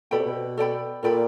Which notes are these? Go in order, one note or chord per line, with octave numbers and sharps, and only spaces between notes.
B2 A4 D5 G5 B5
C3
B2
A4 D5 G5 B5
A#2 A4 D5 G5 B5